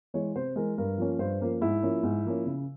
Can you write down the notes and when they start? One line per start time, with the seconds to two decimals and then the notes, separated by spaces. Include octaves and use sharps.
0.14 E3 G#3 C#5
0.35 C3 C5
0.56 E3 G#3 A#4
0.78 G2 A#4
0.98 F3 A#3 C#4
1.19 G2 C5
1.40 F3 A#3 C#4
1.61 G#2 E4
1.82 F3 A#3 C#4
2.03 G#2
2.25 F3 A#3 C#4
2.46 C#3